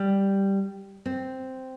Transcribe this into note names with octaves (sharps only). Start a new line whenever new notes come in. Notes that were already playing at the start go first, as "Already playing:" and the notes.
Already playing: G3
C4